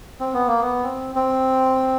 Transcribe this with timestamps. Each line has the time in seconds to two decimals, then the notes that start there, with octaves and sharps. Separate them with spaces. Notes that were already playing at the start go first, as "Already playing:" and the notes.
0.20 C4
0.34 B3
0.48 A#3
0.61 B3
0.83 C4
1.15 C4